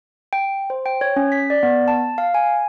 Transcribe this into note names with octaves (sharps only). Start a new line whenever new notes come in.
G5
C5
G5
C#5
C#4
B6
D5
B3
A5
F5
G#5